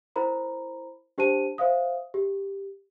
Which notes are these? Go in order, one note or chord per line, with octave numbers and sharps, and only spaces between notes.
E4 A#4 C5 A#5 B5
D4 G4 C5 A5 D#7
C5 E5 F5 D#6
G4